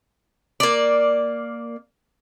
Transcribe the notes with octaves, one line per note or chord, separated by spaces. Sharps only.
A#3 D5